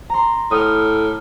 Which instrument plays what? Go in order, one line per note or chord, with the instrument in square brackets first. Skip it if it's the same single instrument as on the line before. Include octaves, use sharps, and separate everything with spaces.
[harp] A#5 C6
[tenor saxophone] A2 [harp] D#6 F6